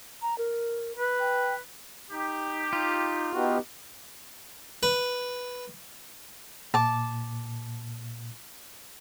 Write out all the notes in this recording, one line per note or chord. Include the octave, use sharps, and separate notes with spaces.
A#5
A#4
B4
G5
D#4 G4
D#4 F4
B3 D#4 F#4 G4
B4
A#2 A5 D6